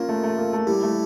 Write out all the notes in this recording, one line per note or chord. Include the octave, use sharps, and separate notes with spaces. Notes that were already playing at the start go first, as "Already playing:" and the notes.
Already playing: A#3 C#4 F4
A3
A3
A#3
A3
G3 E4 G4
A3